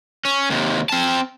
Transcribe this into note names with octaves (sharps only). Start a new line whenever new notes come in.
C#4
D#2 C3
C4 A5